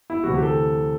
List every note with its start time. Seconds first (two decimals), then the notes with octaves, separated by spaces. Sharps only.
0.10 E4
0.24 D2 C3 E3 F#4
0.34 G4
0.43 A4